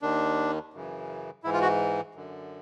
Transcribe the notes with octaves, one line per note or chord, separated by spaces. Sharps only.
D#2 D#3 D4
F#2 C#3 E3
G#2 E3 E4
F4
F#4
F#2 D3